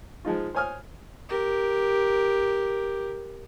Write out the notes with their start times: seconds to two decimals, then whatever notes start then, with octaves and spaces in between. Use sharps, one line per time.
0.25 F3 G#3 D#4 F4
0.55 C5 C#5 G#5 D#6 F6
1.29 G4 A#4